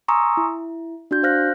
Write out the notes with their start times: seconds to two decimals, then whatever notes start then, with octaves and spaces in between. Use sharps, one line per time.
0.08 G#5 A#5 C6 C#6 D#6 E6
0.37 E4
1.11 D4 F#4 G6
1.23 C5 F5 F6 F#6 A#6